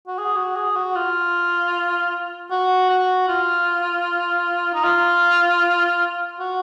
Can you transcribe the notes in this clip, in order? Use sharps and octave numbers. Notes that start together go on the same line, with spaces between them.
F#4
G#4
F#4
G#4
F#4
F4
F#4
F#4
F4
D#4
F4
F#4